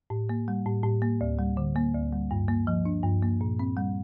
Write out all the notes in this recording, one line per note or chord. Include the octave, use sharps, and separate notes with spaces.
A2
A#3
G3
A2
A2
A#3
D2
G3
D3
A#3
D2
G3
G2
A#3
F3
D4
G2
A#3
A#2
C4
G3